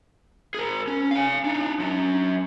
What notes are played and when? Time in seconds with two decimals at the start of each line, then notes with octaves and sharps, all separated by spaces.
0.55 G#4 A#4
0.87 C#4
1.11 F5 G#5
1.44 D4 D#4
1.80 F#3 C#4